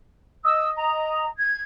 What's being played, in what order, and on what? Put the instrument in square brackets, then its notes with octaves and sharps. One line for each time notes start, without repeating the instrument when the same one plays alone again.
[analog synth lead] D#5 [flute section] E6
[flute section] A#5
G#6